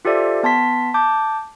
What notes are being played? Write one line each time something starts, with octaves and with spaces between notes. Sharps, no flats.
F4 G4 A4 C5 D5 E5
B3 A5 C6 B6
A5 D6 G6